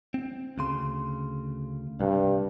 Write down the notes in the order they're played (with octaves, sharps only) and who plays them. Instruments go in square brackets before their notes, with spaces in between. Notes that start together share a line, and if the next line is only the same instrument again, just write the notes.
[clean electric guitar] C4
D2 C#3 C6
[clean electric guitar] C2 [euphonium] G2